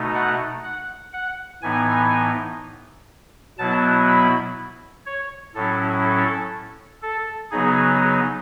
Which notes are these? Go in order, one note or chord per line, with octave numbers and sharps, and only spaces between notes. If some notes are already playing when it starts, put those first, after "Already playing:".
Already playing: B2 A3 D#4
F#5
F#5
F#5
A2 E3 B3 D#4 G#5
B2 F#3 B3 E4 A5
B5
C#5
A2 F#3 C#4 E4 A4
A4
A4
C#3 F#3 B3 D#4 G#4